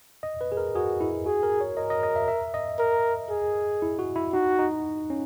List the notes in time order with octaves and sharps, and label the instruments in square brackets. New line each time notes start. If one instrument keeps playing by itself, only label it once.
[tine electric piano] D#5
B4
G#4
A#4
[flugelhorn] F#4 [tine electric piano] G#4
[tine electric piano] E4
[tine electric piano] F#4 [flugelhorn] G#4
[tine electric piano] A#4
C#5
[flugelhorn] A#4 [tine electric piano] D#5
[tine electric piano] D#5
D#5
E5
E5
D#5
[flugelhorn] A#4
G#4
[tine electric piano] E4
F#4
E4
[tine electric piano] D#4 [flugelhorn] F#4
[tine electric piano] D#4
C#4